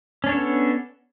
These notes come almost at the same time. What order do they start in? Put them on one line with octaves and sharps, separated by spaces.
C#4 D4 C#5 A4 B3